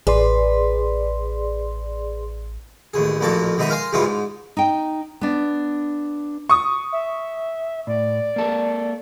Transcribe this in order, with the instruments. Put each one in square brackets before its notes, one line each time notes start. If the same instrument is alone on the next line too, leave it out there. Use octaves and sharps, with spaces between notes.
[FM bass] A1 [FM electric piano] G#4 D5 C6 [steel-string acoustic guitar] B4
[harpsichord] A1 D#2 G#4
A1 F2 A#2 A#3 F#4 A5
D#2 G#2 B2 D#4 D#5 E5
A#4 F5 G#5 A#5 C6
C#2 G2 E3 G#3 F4 F#4
G#2
[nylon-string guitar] D#4 G5
B3 D4
[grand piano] C#6 D#6
[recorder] E5
[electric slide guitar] A2 [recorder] D5
[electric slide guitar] A#3 A4 A#4